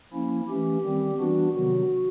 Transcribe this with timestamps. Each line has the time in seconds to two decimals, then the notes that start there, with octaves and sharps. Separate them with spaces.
0.13 F3 A#3 C#4 E4
0.48 E3 A3 C#4 G4
0.84 D#3 G3 C4
1.19 E3 G3 B3 D4 F#4
1.54 C3 D#3 F#3 B3 F#4